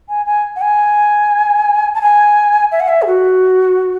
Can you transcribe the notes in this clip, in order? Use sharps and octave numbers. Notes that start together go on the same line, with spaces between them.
G#5
G#5
F#5
G#5
A5
G#5
E5
F#5
E5
G#4
F#4